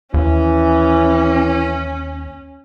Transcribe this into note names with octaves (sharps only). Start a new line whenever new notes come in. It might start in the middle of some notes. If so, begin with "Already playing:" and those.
D#2 E3 C#4